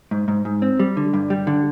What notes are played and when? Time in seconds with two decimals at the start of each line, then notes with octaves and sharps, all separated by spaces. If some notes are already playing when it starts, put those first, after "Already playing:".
0.11 G#2
0.28 G#2
0.45 G#2
0.62 C4
0.79 G3
0.97 D3
1.13 G2
1.30 G3
1.47 D3